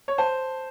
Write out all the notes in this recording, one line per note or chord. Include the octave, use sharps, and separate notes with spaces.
C#5
C5 A5